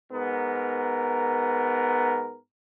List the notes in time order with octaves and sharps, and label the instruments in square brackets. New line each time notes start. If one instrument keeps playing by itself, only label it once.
[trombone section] G#2 B3 A#4